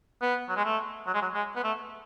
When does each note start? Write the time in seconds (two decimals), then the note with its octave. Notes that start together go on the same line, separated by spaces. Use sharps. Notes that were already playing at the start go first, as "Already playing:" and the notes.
0.21 B3
0.49 F#3
0.56 G#3
0.65 A3
1.07 F#3
1.14 G#3
1.22 F#3
1.34 G#3
1.56 B3
1.63 A3